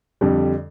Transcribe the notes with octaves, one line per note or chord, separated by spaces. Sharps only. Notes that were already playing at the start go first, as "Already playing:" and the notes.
F2 D3 G3